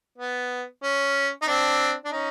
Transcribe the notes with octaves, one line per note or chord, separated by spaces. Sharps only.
B3
C#4
D#4
C4 D4
D4
C#4 D#4